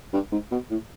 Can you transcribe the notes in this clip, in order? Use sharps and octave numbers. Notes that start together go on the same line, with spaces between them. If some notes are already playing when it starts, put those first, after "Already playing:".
G2
G#2
B2
A2